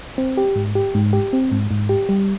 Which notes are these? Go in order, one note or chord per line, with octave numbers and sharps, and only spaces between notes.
C4
G4
G#2
G4
G#2
G4
C4
G#2
G#2
G4
G3